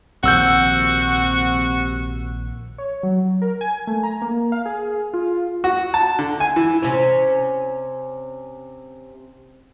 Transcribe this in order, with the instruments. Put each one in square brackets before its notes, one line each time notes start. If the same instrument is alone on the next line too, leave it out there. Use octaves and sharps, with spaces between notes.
[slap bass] A#1 D#3 F3 [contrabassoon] C3 [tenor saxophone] F#4 [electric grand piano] F#5 E6 G6
[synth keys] C#5
F#3
A#4
G#5
A3
A#5
A#3
F5
G#4
F4
[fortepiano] F#4
A5
D3
G#5
E3
[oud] C3 C#4